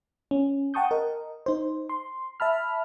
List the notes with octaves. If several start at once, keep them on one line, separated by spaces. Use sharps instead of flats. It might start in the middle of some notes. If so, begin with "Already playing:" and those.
C#4
F#5 G5 A5 C#6 D#6 G6
A#4 D#5
D#4 C5
C6
E5 A5 B5 F6